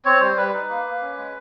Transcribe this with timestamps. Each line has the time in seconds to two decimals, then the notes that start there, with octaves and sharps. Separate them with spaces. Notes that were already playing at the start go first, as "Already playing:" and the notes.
0.05 C4 C#5
0.21 G3 C5
0.37 G3 B4
0.53 D#4
0.69 A#3
0.86 A#3
1.01 C#4
1.17 G#3